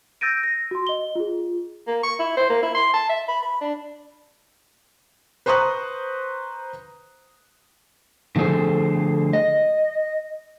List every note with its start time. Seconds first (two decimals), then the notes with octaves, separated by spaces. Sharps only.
0.21 E6 G6 A6 A#6 D7 D#7
0.43 A#6
0.71 F#4 C6
0.87 D#5 G7
1.15 F4 G#4
1.87 A#3
2.03 C#6
2.19 E4
2.37 C5
2.50 A#3
2.63 E4
2.75 C6
2.94 A5
3.10 E5
3.28 B5
3.42 B5
3.61 D4
5.46 B4 C5 A#5 C#6 D#6 F#6
8.36 D3 F3 A3 G#4 A4 C5
9.33 D#5